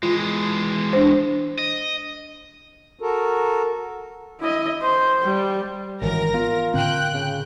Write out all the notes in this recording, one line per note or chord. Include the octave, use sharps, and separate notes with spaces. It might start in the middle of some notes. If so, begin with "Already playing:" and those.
E3 G#3 F4
D4 C5
D#5
F#4 A4 A#4
E4 D#5
C5
G3
G#1 F#2 D#3 E3 A#4 A#6
B3 F4
A2 D3 C4 G5 F#6
C#3